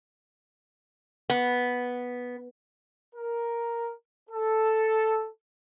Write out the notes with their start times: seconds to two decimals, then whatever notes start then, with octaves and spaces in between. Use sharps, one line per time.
1.30 B3
3.14 A#4
4.29 A4